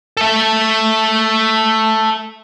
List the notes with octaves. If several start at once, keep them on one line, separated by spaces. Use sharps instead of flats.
A4 E5